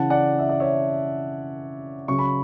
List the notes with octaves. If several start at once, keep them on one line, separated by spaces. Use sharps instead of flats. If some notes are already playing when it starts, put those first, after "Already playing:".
Already playing: C#3 E3 F#5 A5
D5 F#5
E5
D5
C#5 E5
C#3 F#3 C#6
B5